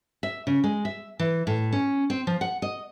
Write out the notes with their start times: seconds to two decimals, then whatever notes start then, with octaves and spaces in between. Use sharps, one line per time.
0.23 E5
0.47 C#3
0.64 G#3
0.85 E5
1.19 E3
1.47 A2
1.73 C#4
2.10 C4
2.27 F3
2.41 F#5
2.62 D#5